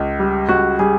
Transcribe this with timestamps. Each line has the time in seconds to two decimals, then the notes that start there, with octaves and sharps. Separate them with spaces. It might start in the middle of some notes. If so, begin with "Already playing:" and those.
Already playing: C#2
0.19 G3
0.49 C#2 F#4
0.79 G3 G#4